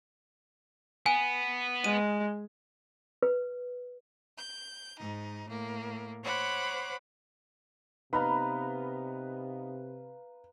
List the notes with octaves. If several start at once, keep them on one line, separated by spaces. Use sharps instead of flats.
B3 G#5
G#3 D#7
B4
G6
G#2 D#4
A2 A#3
C5 C#5 F#5 B5 D6
C3 B3 D#4 B4 F5 A#5 B5